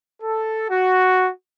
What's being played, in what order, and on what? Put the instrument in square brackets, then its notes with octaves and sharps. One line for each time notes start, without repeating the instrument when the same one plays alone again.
[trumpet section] A4
F#4